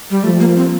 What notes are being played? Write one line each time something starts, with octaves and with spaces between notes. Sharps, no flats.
G3
F3 A3
A#3
C4